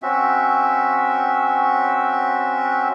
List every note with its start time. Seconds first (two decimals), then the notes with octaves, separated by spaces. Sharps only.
0.03 C4 C#4 F#4 E5